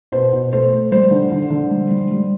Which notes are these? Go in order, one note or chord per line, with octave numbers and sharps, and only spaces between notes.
B2 C5
B2
A3 C5
A3
G3 C5
D3
D3
D3
G3
G3
G3